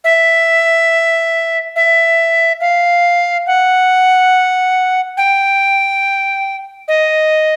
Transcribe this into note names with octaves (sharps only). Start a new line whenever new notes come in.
E5
E5
F5
F#5
G5
D#5